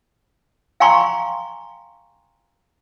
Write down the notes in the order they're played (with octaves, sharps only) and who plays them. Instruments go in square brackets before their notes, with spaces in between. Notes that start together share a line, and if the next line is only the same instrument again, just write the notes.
[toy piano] F5 G5 G#5 A#5 C6 C#6